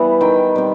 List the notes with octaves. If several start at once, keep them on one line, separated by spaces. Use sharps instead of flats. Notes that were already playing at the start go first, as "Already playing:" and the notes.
Already playing: E3 G3 B3 E5
D#3 G5
G3 C4